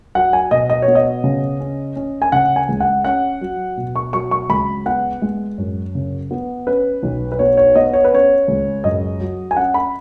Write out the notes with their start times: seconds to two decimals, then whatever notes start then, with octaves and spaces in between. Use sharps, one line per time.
0.15 F#3 F#5
0.33 G#5
0.51 B2 D#5
0.70 D#5
0.82 C#5
0.88 B3
0.95 D#5
1.24 C#3
1.60 C#4
1.96 C#4
2.22 G#5
2.32 C#3 F#5
2.56 G#5
2.68 C#2
2.80 F#5
3.04 C#4 F#5
3.41 F#3
3.77 B2
3.96 C#6
4.13 F#3 C#6
4.31 C#6
4.49 C#2 B5
4.86 B3 F#5
5.22 G#3
5.58 F#2
5.95 C#3
6.31 B3
6.67 C#4 B4
7.03 B1
7.32 B4
7.39 B3 C#5
7.57 C#5
7.75 B3 D#5
7.93 C#5
8.04 B4
8.12 C#4 C#5
8.48 C#2
8.84 F#2 D#5
9.20 F#3
9.51 G#5
9.57 C#4 F#5
9.74 B5